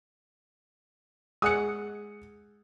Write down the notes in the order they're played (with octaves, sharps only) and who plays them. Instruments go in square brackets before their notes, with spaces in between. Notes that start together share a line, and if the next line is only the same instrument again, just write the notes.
[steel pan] G#3 G#4 F#5 [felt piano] D#6 C#7